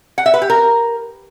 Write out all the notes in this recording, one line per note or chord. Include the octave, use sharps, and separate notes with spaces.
F#5
E5
B4
G4
A#4